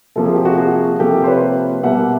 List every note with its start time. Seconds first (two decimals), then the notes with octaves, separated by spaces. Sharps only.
0.16 C3 F3 A#3 A4
0.25 G#4
0.35 G4
0.45 F#4 G#4
0.57 F#4 G#4
0.99 C3 F3 A#3 G4 A4
1.24 C5
1.27 B4 C#5
1.83 B2 G3 A#3 E5 F#5